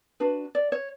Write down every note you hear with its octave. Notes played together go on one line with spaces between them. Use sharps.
D4 F#4 B4
D5
C#5